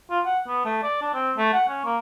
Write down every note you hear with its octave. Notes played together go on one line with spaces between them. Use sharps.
F4
F#5
B3
A3
D5
D4
C4
A3
F#5
C#4
A#3